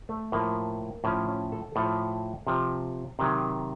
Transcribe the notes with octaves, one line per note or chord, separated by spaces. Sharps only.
A3
A2 F3 A#3
A2 F3 C#4
C#4
A4
A2 F3 A4
C3 F3
C3 D#3 F#3